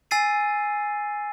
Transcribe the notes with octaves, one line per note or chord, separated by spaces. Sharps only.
G#5 E6 A6 C7 D#7